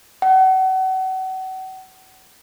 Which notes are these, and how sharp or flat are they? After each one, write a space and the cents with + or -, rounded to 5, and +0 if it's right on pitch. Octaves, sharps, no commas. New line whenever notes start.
F#5 +35